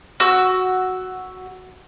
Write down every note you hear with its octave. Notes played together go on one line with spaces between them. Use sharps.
F#4 E6